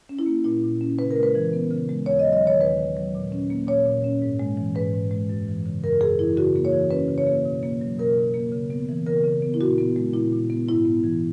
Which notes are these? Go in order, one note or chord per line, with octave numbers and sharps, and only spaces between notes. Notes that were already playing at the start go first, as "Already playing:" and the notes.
C#4
E4
A#3
A#2 E4
A#2
C#4
C#3 B4
A#4
G#3
B4
E3
B3
C#3
G#3
D#2 C#5
D#5
F#3
D#5
D#3 C#5
D#2 B4
D#2
F#3
A#2
C#4
A#3
A#2 C#5
A#2
C#4
G#2
G#3
E3
G#2 B4
G#2
G#3
F#2
E3
C#3
F#2 A#4
F#2 G#4
E3 E4
C#3 F#4
A#3
C#5
E3
C#4 B4
C#3
C#5
A#3
B2
A#3
F#3
B2 A#4
B2
A#3
C#3
B3
E3
C#3 A#4
C#3
B3
E4
A#2 F#4
B3
G#3
A#2 E4
A#2
B3
G#2 E4
B3
E3